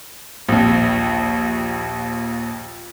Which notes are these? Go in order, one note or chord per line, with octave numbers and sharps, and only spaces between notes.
A#1 D#2